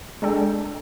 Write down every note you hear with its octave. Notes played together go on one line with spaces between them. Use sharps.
G#3 D4 A4 G5